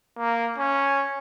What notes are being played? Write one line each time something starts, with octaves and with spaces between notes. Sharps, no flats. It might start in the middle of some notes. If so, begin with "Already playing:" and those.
A#3
C#4